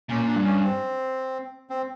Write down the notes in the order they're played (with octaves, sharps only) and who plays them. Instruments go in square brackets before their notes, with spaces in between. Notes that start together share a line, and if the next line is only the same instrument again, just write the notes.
[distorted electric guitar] A#2 [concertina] C#4
[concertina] D4
[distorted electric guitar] G2
[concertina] C#4
C4
C4